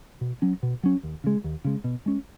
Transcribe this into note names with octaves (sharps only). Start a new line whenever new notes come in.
B2
F#3 C#4
B2
F#3 C#4
D#2
C#3 G#3
D#2
C#3 G#3
B2
G#3 C#4